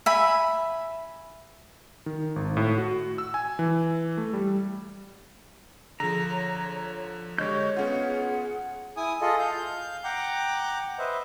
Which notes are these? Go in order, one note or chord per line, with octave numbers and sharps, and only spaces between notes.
E5 G#5 B5
D#3
G#1
A2
F#4
E6
G#5
E3
A3
G3
D3 F3 G#4 A#5
C#5
D3 G#3 G4 C#5 D#5 C#6 G6
B3 C#4 F4 G#4 F#5
E4 G#5 D#6
F4 G#4 A4 D#5
F5 G6
F#5 G5 A#5 D6
B4 C5 D#5 E5